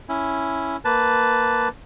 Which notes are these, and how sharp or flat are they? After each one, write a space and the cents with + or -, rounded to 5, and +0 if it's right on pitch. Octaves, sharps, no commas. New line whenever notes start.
C#4 +0 E4 +0
A#3 +0 B4 +5 A5 +0